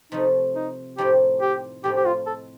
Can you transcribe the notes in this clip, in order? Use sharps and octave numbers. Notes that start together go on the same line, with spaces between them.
C3 F3 A3 D#4
D#4
A2 F3 C4 D#4 G4
G4
A2 F3 C4 D#4 G4
G4
F4
A4